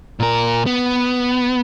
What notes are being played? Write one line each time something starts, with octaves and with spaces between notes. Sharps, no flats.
A#2 A#4
B3